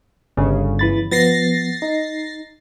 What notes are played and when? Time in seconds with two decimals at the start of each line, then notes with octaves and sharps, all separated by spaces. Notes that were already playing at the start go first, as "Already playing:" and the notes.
0.37 G1 C#3
0.79 E3 B5 A6
1.11 F3 B3 A6 A#6 C7
1.82 D#4